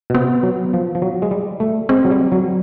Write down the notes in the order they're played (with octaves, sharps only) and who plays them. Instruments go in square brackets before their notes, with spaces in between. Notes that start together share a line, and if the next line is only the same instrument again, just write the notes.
[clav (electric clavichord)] B2
[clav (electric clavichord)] C3 [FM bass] B3
[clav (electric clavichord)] F#3
F3
F3
F#3
G#3
G3
A3
[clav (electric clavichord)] G#3 [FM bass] C4
[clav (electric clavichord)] F#3
G3
F#3